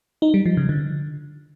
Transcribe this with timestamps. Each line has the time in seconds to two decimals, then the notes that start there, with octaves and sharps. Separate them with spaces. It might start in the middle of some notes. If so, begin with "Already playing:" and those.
0.22 D#4
0.34 G3
0.46 F3
0.57 C#3
0.69 D3